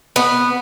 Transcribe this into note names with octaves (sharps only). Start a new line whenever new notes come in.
B3